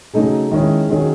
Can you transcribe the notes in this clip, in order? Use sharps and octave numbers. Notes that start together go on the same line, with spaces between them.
C#3 F#3 A3 D#4 G#4
D#3 G#3 C#4 E4
D#3 F#3 C#4 G#4